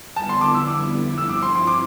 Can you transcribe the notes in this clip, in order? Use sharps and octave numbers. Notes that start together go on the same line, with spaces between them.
F2 D3 G3 B3 E4 A5
C6
D6
E6
D6
G2 F3 C4 E4 E6
D6
C6
C6
D6